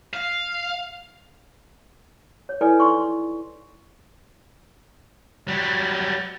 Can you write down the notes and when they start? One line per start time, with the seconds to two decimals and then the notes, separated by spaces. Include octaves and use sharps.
0.13 F5
2.49 C#5
2.61 E4 A4 B4 D5 G#5
2.80 D#4 C6 C#6
5.48 F#3 G3